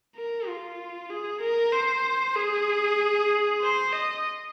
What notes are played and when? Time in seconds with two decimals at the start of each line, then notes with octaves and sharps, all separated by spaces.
0.16 A#4
0.48 F4
1.10 G#4
1.41 A#4
1.72 C5
2.36 G#4
3.61 C5
3.92 D#5